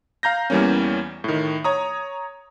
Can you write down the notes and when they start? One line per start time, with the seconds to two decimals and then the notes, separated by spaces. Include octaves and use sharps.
0.23 F5 A#5 G6 A#6
0.50 E2 E3 G3 A#3 C#4
1.24 A2 D#3
1.64 C#5 A#5 D#6